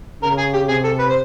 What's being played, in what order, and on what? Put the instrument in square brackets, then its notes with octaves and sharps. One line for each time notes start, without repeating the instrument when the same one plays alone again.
[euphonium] C#3 [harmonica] A#4
[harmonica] G#4
G4
[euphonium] C3 [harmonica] G#4
[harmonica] A4
B4
C5